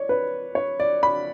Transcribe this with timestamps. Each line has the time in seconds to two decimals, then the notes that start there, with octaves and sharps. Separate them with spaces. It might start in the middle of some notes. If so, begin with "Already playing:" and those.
Already playing: C#5 D5
0.09 B4
0.55 C#5
0.80 D5
1.03 B5